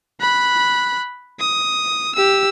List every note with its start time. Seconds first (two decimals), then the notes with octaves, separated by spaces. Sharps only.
0.21 B5 F#6
1.40 D#6
2.15 G4 E6